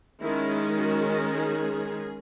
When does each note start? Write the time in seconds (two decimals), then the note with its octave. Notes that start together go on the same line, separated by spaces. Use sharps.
0.21 D#3 G#3 C#4 E4
0.76 F#4
1.31 G#4